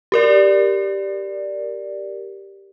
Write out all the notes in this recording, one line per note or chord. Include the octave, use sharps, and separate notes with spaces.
G4 A#4 D5